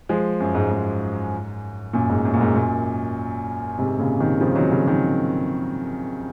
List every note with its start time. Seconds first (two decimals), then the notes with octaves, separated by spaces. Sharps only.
0.09 F3 G#3
0.40 F#2
0.55 G#2
0.71 G#2
1.93 F#2 A#2
2.09 G#2
2.25 F#2
2.34 A#2
2.41 G#2
2.56 F#2 A#2
3.79 G#2 C3
3.99 A#2 C#3
4.20 C3 D#3
4.41 C#3 F3
4.55 D#3 F#3
4.72 C#3 F3
4.87 D#3 F#3